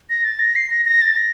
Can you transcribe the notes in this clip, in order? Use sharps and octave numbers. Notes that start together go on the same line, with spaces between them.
A#6
A6
A#6
C7
A#6
A#6
A6
A#6